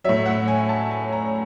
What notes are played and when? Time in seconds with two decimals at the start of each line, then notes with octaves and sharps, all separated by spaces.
0.04 A2 F#3 E5
0.26 F#5
0.48 G#5
0.69 A5
0.91 G#5
1.13 A#5